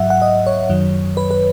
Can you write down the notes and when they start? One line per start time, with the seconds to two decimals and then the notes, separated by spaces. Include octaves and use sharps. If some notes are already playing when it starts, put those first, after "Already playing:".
Already playing: G#2 F#3 E5 F#5
0.10 F#5
0.22 D#5
0.46 C#5
0.69 F#2 D#3 F#3
1.17 B4
1.31 B4